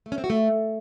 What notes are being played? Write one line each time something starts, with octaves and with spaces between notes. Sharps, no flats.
A3
C#4
C4
F#4
A3